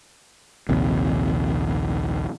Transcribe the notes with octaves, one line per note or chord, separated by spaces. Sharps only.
A#1 D#2 C3